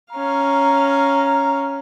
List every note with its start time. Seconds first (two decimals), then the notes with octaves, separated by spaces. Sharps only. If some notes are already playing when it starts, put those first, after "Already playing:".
0.12 C#4 F5 A#5